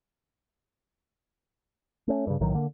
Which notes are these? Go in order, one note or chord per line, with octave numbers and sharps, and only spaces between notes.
A3 C#4
G2 C#3
B1 A2 D#3 F#3
D3 A#3